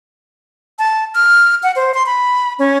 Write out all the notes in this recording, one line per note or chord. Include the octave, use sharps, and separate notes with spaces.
A5
F6
F#5
C5
C6
B5
C#4